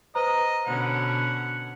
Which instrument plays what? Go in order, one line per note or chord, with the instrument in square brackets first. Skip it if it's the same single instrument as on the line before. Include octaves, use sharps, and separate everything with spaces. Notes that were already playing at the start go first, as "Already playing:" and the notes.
[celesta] B4 C5 A#5 [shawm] D#5
[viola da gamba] B2 D3 C#4 [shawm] F#5